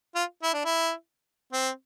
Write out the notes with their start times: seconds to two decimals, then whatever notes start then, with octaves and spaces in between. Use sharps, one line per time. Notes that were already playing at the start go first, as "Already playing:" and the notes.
0.15 F4
0.43 E4
0.54 D4
0.65 E4
1.53 C4